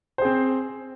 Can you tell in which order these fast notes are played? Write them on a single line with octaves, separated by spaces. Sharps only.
C5 G#4 C4